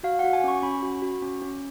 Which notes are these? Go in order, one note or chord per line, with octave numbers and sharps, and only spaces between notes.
F#4 F5
F#5
F#4
G#5
C#4 C#6
C#4 B5
F#4
F#4
C#4
C#4